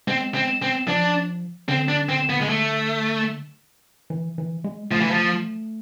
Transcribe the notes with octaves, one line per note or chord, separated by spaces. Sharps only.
G#3 C4
C4
C4
F3 D4
D3 C4
D4
C4
B3
G#3
A3
E3
E3
G#3
F3 A3
E3
F3